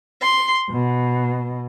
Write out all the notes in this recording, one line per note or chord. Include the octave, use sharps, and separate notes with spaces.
C6
B2